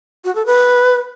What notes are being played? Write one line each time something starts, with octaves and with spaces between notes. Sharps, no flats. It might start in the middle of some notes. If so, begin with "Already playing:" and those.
F#4
A4
B4